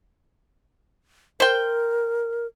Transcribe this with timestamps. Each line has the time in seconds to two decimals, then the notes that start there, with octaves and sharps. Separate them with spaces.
1.40 A#4 C5 G5